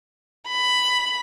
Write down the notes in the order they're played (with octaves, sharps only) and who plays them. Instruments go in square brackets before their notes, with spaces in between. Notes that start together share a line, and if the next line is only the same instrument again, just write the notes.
[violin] B5